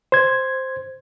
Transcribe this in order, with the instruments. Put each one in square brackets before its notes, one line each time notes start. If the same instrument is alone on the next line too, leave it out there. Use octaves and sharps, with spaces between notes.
[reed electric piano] C5 G#6